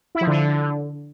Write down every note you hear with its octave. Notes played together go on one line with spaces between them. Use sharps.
E4
F3
D3